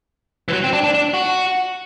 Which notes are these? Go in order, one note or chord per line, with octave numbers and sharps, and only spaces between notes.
E3
F#3
C4
D4
D4
D4
F#4